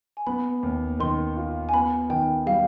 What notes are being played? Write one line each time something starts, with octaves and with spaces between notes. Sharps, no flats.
G#5
B3 B5
D#2
D#3 C6
F4
G#5
B3 B5
D#3 G5
G3 F5